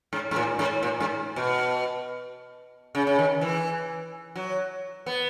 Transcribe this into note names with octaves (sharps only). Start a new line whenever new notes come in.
G#2
G#2
A#2
G#2
A#2
G#2
B2
C#3
C#3
D#3
E3
F#3
B3